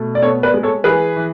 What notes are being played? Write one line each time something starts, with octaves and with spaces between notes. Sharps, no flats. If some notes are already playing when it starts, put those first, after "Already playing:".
Already playing: B2 A3
D5
B3 A4 C#5
B4 D5
G#3
A4 C#5
E3 G#4 B4
E3